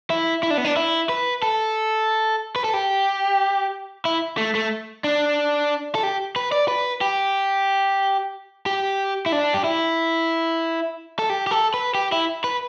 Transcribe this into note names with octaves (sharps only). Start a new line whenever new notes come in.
E4
E4
D4
B3
D4
E4
B4
A4
B4
A4
G4
E4
A3
A3
D4
A4
G4
B4
D5
B4
G4
G4
E4
D4
G4
E4
A4
G4
G4
A4
B4
G4
E4
B4